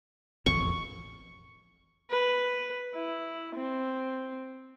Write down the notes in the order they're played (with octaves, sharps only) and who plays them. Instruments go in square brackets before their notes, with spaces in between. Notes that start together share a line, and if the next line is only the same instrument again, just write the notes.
[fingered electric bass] E1 A1 F2 [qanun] C#6
[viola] B4
E4
C4